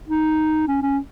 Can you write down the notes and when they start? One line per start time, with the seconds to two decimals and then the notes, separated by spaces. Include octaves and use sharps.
0.08 D#4
0.68 C#4
0.82 C#4